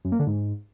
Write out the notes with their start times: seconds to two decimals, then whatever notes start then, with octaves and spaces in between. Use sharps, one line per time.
0.05 F#2
0.12 A#3
0.19 D3
0.27 G#2